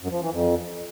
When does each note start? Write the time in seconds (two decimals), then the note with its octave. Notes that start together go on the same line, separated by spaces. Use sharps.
0.01 F#2
0.11 F3
0.21 E3
0.32 F2